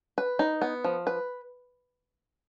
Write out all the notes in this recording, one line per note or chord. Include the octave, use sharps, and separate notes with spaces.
B4
D#4
B3
F3
B4